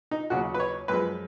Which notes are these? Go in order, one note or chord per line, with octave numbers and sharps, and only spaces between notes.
D#4
D#2 C#3 F#3 F#4
B4
C#5
F#2 F3 G#3 B4